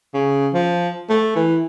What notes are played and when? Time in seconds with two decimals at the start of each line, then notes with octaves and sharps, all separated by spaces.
0.14 C#3
0.54 F3
1.10 A3
1.36 E3